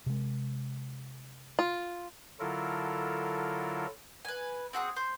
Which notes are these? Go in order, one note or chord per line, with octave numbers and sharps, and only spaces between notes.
C3 G#3
F4
D3 F#3 E4 F4 A4 A#4
B4 G#5
C4 F#4 G#4 D#6
C5